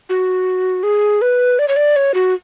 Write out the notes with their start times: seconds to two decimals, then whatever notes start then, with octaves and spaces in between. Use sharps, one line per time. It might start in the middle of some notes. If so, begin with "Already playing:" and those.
0.09 F#4
0.83 G#4
1.22 B4
1.59 D5
1.68 C#5
1.76 D5
1.96 C#5
2.14 F#4